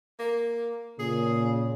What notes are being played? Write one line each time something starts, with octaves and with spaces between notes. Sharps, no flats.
A#3
A#2 C#3 G#4